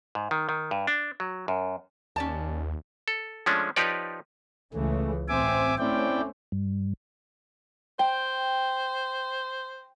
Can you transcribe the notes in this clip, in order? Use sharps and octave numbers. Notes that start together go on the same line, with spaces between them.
G#2
D#3
D#3
G2
D4
F#3
F#2
D#2 C#4 D5 A5
A4
F3 G#3 A3 C#4 D4
F3 D#4 G4 B4 C#5 D5
C#2 C#3 E3 A3
A1 C4 E5 G#5 D6
A3 C4 C#4 E4 D5 G5
G2
C5 G5